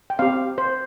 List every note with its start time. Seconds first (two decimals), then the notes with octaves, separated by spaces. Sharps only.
0.10 G5
0.19 C4 G4 F5
0.58 C5